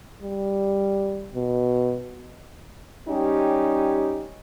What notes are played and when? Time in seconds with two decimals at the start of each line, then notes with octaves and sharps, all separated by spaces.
0.22 G3
1.34 B2
3.08 G3 C#4 D#4 G4